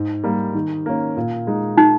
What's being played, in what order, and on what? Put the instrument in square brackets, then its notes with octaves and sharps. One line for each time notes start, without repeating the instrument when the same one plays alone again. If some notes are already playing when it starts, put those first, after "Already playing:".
Already playing: [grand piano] G#2
G3 A#3
D#3
A#3 C#4
A#2
G#3 D#4
[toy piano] D#4